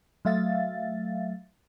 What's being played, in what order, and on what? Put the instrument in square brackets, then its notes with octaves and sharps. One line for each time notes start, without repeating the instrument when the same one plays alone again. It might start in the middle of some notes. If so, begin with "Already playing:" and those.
[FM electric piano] F#3 A3 E5 F5 A6